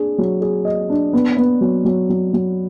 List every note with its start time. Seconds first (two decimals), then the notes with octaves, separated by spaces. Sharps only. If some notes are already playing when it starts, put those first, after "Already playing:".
Already playing: D4 G#4
0.18 F#3
0.42 G#4
0.65 D#5
0.90 D4
1.13 B3
1.37 B3
1.61 F#3
1.85 F#3
2.09 F#3
2.33 F#3